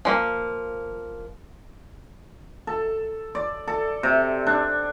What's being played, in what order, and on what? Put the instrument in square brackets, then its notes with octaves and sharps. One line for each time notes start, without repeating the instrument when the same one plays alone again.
[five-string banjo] F3 G#3 A#3
[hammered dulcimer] A4
D5
A4
C3
D4